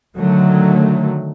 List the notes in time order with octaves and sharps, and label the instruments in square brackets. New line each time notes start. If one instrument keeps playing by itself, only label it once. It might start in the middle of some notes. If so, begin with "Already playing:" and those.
[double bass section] D3 D#3 F#3 A3